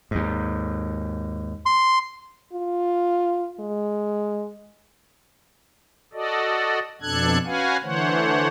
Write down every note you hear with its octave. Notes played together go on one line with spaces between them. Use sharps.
D#2 G#2
C6
F4
G#3
F#4 A4 D5 D#5
F2 B2 D4 A4 F#6 G#6
C#4 F#4 B4 F5 F#5 G#5
D3 E3 A3 C5 C#5 F#5